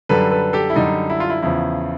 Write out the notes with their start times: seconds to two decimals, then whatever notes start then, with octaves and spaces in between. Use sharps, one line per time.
0.09 F#2 D3 G3 A4 B4
0.31 A4 B4
0.53 G4 A4
0.70 E4
0.75 F#2 D3 G3 D#4
1.10 E4
1.20 F4
1.30 E4
1.42 E2 C#3 F3 E4